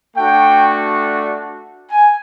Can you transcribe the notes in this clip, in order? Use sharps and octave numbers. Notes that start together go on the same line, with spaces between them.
A3 D4 F#4 G5
G#5